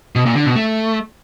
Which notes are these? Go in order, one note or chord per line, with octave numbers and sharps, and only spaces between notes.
B2
A#2
D3
B2
A3